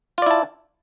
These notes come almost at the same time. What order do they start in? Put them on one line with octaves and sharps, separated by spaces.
F4 D5 E4 A5